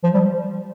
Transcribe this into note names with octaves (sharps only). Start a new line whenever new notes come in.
F3
G3